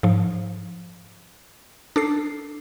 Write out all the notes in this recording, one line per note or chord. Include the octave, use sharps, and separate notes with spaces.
G#2 F3
D4 A4 C7